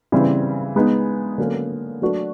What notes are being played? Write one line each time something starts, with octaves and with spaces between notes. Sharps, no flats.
C#3 E3 G3 C4
G#3 B3 D#4
D3 F#3 A#3 C#4
F#3 A3 D4 F#4